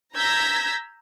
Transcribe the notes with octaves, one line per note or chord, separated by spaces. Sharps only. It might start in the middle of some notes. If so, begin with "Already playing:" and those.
A#5 E6 G6 G#6 A#6 B6